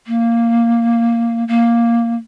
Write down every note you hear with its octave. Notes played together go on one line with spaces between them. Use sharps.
A#3
A#3